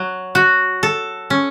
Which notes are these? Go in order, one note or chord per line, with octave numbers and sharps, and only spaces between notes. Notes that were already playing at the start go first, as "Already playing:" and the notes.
Already playing: F#3
F#4
A4
C#4